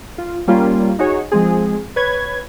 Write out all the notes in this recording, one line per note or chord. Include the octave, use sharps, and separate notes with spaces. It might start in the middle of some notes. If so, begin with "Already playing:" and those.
F4
G3 A#3 C#4 F4
D#4 F#4 G#4 C#5
F3 G#3 C4 G#4
B4 C#5 G#6